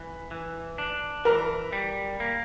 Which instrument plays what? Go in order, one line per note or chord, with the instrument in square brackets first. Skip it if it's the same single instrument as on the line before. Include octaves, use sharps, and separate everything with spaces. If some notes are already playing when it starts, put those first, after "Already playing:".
Already playing: [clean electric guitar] E3
E3
D4
[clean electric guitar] E3 [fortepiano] A#4
[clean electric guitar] G3
A#3